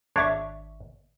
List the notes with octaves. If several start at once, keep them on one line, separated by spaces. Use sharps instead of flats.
G#1 D4 C#5 E5 C#6